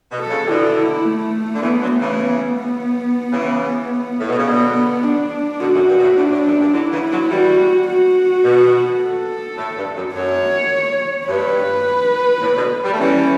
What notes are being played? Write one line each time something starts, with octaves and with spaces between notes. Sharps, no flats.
B2
A4
C#3
B2 D3 E4
A3
D3
C#3 E3 B3
D3 F#3
A3
C#3 E3
B3
C#3 E3
A2
B2
C#3
B2 D3 B3
D4
B2 D3 F#4
F#2
G2
B2
A2
A2 D4
A2
F#2
G2
D3 F#3 E4
C#3 E3
E4
D3 F#3
E3 G3 F#4
F#4
B2
A4
A2
G2
F#2
F#2 C#5
G2 B4
A2
B2 D3
G3
A3
E3 G3 C#4